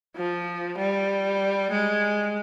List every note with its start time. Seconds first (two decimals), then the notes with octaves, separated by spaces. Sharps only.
0.16 F3
0.78 G3
1.72 G#3